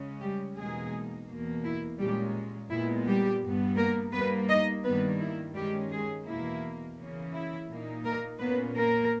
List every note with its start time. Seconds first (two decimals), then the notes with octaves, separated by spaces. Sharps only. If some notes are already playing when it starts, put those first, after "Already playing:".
Already playing: C#3 G#3 C#4
0.21 G3 G4
0.57 E2 B2 G#3 A#3 D#4 G#4
1.28 E2 B2 A#3
1.64 E4
1.99 A#2 G3 G#3 C#4 G4
2.70 A#2 G#3 B3 E4
3.05 G3 G4
3.42 G2 G3 B3
3.77 A#3 A#4
4.12 G2 G3 A#3 B3 B4
4.48 D#4 D#5
4.84 G2 D#3 G3 A#3 B3 B4
5.20 E4
5.54 D#3 G3 G#3 C#4 G4
5.90 G#3 G#4
6.25 E2 B2 A#3 E4
6.98 C#3 E3 A#3 C#4
7.33 E4
7.68 A#2 A#3 D#4
8.04 A#3 A#4
8.39 A#2 A#3 B3 C#4 B4
8.74 A#3 A#4